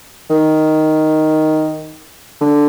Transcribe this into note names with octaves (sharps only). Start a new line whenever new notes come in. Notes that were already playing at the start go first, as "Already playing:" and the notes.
D#3
D3